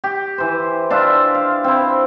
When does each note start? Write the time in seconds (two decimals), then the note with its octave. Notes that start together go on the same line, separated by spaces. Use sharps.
0.04 G4
0.38 E3 C5
0.90 D4 F4 E5
1.35 F5
1.64 C4 E4